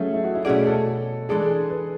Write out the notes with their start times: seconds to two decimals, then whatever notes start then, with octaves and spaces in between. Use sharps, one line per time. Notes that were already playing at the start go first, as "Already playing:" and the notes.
Already playing: F#3 A3 C#4 G#4 A4
0.14 E4
0.24 F#4
0.35 E4
0.45 B2 A3 C#4 F#4 G#4 D5
0.67 A4
1.29 E3 G#3 D4 G#4 A4 D5
1.70 B4